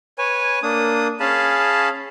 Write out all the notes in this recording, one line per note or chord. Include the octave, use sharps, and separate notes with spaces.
B4 C#5 G#5
A#3 D4 D#6
C#4 G#4 F5 A5 B5